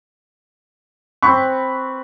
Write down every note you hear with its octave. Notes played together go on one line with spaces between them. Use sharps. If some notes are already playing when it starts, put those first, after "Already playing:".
C4 B4 C#6